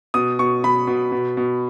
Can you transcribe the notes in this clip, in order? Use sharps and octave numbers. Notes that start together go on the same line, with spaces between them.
B2 D#6
B2 C#6
B2 B5
B2
B2
B2